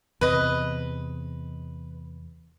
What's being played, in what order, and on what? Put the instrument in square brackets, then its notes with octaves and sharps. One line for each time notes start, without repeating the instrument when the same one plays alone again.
[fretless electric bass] E2 C3 [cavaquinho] B4 D#5